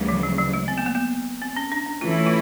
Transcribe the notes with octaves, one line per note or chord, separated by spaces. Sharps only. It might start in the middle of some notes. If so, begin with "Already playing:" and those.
Already playing: D2 C#3 E3 G3
F3
F#3
F#3
G#3
C4
B3
A#3
B3
C4
C#4
D4
D4
E3 A3 C#4 E4 F4
F4